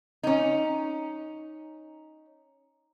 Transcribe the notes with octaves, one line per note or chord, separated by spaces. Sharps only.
C#4 D#4